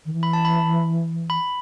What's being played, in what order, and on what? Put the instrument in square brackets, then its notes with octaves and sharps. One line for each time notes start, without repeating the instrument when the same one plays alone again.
[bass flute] D#3
E3
[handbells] B5
A5
B5
B5